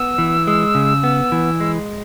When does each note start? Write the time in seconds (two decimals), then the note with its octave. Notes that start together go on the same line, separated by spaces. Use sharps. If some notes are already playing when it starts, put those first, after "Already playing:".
Already playing: B3 E6
0.18 E3
0.47 G#3
0.75 C#3
1.04 B3
1.32 E3
1.60 G#3